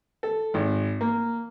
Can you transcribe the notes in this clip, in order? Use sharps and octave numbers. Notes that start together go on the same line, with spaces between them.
A4
G#1
A#3